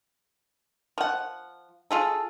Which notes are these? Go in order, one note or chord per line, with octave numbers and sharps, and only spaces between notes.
F3 F#5
F4 G#4 A4